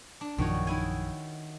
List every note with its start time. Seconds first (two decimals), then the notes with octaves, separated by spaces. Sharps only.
0.21 D4
0.38 A#1 F#2 D#3 F3 F#4 C#5
0.67 D#3 E4 G#5